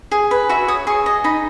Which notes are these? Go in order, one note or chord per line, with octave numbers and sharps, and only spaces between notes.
G#4
B4
F#4 E5
C#5 D#6
G#4 C#6
D#5
D#4 B5